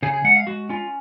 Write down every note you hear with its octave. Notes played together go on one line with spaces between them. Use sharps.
C#3 G#4
G#4
G#3 F#5
F5
G#3 F#4
C#4 F4